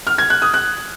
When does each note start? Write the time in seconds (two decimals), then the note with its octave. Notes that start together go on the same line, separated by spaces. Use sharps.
0.07 F6
0.18 G#6
0.30 F#6
0.42 D#6
0.54 F#6